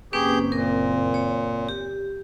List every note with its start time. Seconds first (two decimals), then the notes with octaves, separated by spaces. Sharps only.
0.13 F#1 A#3 C4 C#4 G4 G#4 B4 G6
0.52 A#2 A#4
1.14 C#5
1.69 G4